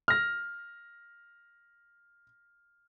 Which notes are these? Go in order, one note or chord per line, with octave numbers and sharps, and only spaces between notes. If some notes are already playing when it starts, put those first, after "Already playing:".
F6 A#6